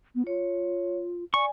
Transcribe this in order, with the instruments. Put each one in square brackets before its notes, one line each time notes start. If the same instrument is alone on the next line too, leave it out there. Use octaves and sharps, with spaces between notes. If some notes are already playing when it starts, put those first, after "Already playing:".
[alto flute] B3
[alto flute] F4 [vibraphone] C#5
[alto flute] D5 [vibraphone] G#5 [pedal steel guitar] C#6